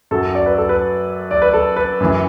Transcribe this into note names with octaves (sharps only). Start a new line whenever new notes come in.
F#2 F#3 A4
D5
B4
A4
B4
D5
B4
A4
B4
F#2 E3